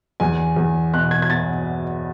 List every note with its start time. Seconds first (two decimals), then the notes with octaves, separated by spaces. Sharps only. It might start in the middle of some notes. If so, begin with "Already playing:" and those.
0.20 E2 G#5
0.56 E2
0.94 B2 F#6
1.11 G#6
1.22 G#6
1.30 B2 A6